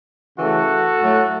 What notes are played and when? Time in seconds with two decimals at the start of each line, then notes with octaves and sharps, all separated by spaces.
0.38 C#3 E3 A3 F#4 A4
0.99 A2 F#3 A3